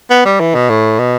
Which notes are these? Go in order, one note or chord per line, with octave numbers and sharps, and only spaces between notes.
B3
G3
E3
B2
A2
B2